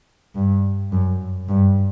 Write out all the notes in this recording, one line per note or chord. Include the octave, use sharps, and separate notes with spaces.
G2
F#2
G2